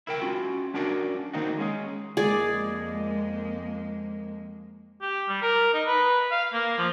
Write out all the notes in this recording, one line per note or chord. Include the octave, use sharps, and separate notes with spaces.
E4 A#4 G5
C#4 F4 F#4
C#4 D4 F#4 A#4 D5
D#3 A#3 C4 D#4 F#4
G#3 C#4 G#4
F2 G#3 A#3 G#4 D5
G4
G3
A#4
D#4
B4
F5
A#3
F3